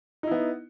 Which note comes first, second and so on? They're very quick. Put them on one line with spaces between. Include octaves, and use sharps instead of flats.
D#4 E4 B3